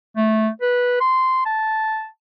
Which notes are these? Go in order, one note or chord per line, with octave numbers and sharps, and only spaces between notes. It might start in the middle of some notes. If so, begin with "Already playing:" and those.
A3
B4
C6
A5